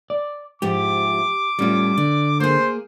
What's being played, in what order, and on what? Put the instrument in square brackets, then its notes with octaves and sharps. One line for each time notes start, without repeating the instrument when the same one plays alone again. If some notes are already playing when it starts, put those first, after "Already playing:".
[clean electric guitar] D5
[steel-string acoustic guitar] G#2 F3 E4 [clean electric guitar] G4 [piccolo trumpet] D6
[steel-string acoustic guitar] A2 F4 [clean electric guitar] G3 C#4
[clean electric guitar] D3 [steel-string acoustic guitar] D5
[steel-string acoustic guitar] A#3 G#4 [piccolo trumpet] C5